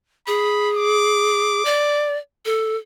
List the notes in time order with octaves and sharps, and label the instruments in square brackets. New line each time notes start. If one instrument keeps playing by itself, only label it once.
[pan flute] G#4 [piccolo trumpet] B5
[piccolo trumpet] D6
[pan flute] D5
A4